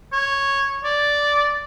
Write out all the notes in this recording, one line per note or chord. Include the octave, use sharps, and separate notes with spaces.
C#5
D5